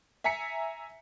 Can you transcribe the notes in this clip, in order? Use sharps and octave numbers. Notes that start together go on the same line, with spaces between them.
E5 G#5 A#5 B6 C#7